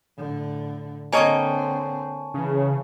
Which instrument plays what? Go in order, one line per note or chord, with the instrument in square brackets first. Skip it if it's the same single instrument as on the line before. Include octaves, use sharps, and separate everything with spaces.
[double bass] A2 D3
[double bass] D3 C4 [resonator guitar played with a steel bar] A#3 C#5 D#5 [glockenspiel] G#5 A5 C#6
[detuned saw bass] C#3 [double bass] E3